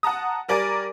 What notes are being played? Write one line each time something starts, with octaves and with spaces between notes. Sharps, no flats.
F#5 A5 A#5 D#6
G3 A#4 D5 G#5 A6 D7